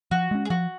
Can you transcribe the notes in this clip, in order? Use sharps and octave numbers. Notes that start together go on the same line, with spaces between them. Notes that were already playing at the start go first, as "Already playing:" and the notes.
F3 F#4
G#3 C#4
G#4
F3 F#4